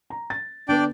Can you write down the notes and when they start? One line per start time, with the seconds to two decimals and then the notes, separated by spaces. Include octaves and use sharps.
0.10 A#5
0.30 A6
0.69 D3 B3 D4 B4 D5 G5